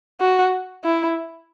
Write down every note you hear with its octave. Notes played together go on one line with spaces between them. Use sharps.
F#4
E4